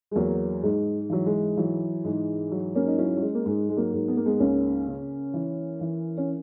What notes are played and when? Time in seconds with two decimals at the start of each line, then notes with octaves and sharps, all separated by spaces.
0.11 G#3
0.15 E2 F#3 A#3
0.63 G#2 G#3
1.10 E3 F#3
1.26 G#3
1.57 E3 F#3
2.04 G#2 G#3
2.52 F#3
2.75 A#3 C#4
2.87 D#4
2.99 F#3 C#4 E4
3.17 F#3
3.22 G#3
3.35 A#3
3.45 G#2 G#3
3.69 G#3
3.77 F#3 A#3
3.93 G#2
4.08 B3
4.17 A#3
4.26 G#3 B3
4.39 C#2 A#3 C#4
4.87 C#3
5.34 E3
5.81 E3
6.18 C#4